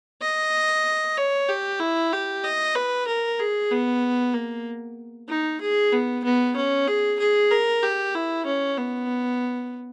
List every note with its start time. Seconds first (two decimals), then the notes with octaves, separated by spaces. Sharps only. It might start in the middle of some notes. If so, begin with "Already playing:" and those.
0.21 D#5
1.17 C#5
1.49 G4
1.80 E4
2.12 G4
2.44 D#5
2.75 B4
3.07 A#4
3.39 G#4
3.71 B3
4.34 A#3
5.29 D#4
5.61 G#4
5.92 B3
6.24 B3
6.56 C#4
6.88 G#4
7.19 G#4
7.51 A#4
7.83 G4
8.15 E4
8.46 C#4
8.77 B3